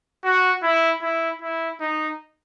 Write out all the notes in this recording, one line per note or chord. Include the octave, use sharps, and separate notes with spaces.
F#4
E4
E4
E4
D#4